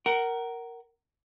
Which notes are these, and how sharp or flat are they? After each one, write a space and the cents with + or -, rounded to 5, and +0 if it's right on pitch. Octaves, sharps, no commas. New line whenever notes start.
A#4 +0 F#5 +30